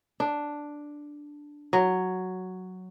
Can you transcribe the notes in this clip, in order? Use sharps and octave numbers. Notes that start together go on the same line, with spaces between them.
D4
F#3